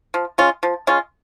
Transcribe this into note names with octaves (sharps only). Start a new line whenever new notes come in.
F3
G#3 C#4 F4
F3
G#3 C#4 F4